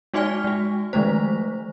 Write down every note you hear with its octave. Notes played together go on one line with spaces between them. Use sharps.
G#3 D#4 F#4 D5 G#5 F6
G#3 F#4
D#3 F3 G#3 A3 C5